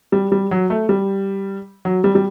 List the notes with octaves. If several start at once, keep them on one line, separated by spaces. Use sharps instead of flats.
G3
G3
F#3
A3
G3
F#3
G3
G3